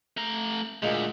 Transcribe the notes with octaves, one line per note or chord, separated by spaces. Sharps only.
A3 A#5
D2 A#2 G#3